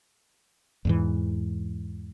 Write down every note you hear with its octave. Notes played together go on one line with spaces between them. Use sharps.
E2 G#2 E3